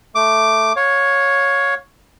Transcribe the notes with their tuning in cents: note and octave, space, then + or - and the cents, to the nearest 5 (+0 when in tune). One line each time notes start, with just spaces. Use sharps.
A3 +0 D6 +5
C#5 +0 F5 +30